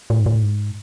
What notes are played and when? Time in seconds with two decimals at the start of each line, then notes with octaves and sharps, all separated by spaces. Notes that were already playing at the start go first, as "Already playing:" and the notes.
0.10 A2
0.21 G#2
0.26 A2
0.42 G#2